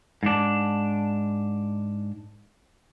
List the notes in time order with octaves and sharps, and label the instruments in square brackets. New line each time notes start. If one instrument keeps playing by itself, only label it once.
[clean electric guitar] G#2 D4